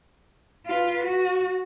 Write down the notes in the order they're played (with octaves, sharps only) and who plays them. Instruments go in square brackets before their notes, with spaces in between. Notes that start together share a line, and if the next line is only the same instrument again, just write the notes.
[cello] F4 B4
F#4